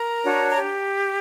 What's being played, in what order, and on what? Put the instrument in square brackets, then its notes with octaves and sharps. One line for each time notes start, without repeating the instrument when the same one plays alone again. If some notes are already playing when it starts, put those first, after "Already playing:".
Already playing: [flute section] A#4 A#5
D4 F#4 C#5
A#5
G4